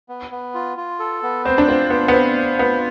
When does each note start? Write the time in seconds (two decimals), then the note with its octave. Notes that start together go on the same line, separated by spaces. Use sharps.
0.09 B3
0.31 B3
0.54 F4
0.77 F4
0.99 A4
1.23 B3
1.45 C4 C5
1.58 D4
1.68 C4 F4
1.90 B3 C5
2.08 B3
2.13 C4 F5
2.37 C5
2.59 B3 F4